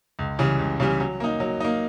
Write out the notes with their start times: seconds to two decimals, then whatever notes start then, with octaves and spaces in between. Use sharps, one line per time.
0.19 C#2
0.39 C#3 E3 G3
0.59 C#2
0.80 C#3 E3 G3
1.00 F#3
1.20 A#3 D#4
1.40 F#3
1.60 A#3 D#4